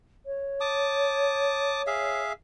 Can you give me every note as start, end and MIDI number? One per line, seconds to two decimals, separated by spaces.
0.26 2.21 73
0.61 1.82 81
0.61 1.82 86
0.61 1.82 87
1.87 2.32 68
1.87 2.32 76
1.87 2.32 77